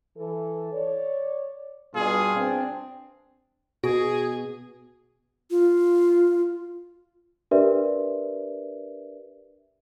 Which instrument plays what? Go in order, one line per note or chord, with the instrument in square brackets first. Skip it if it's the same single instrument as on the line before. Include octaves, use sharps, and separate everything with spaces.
[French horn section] E3 A4
C#5 D5
[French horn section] G2 B2 [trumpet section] F4 G#4
[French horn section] C4 D4
[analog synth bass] B2 [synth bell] F#4 [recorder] G#4
[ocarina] F4
[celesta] D4 G4 A#4 B4 D5 E5